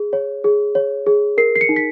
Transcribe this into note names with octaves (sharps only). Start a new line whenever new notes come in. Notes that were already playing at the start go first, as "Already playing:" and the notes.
Already playing: G#4
C#5
G#4
C#5
G#4
A#4 C7
C7
C#7
D#4
B6